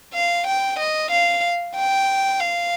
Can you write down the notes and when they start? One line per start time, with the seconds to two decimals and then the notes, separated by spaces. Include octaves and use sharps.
0.14 F5
0.47 G5
0.79 D#5
1.11 F5
1.76 G5
2.40 F5